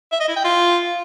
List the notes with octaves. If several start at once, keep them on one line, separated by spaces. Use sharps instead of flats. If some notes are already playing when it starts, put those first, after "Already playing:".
E5
D#5
E4
G5
F4